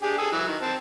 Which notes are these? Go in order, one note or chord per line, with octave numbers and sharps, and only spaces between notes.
D4 G4 G#4
G#4 A4 D#6
E3 F#3
D#3
C4 A5